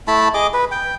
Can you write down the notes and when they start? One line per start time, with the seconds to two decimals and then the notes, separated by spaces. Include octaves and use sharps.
0.08 A3 E4 A5 B5
0.34 G#4 D#5 D6
0.54 B4
0.71 G5